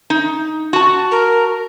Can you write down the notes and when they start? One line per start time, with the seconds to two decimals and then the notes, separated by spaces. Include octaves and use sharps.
0.10 D#4
0.73 F#4 A5
1.11 A#4